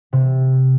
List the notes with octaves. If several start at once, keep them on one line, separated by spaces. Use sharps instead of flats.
C3